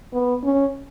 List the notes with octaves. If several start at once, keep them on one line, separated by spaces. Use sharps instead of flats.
B3
C#4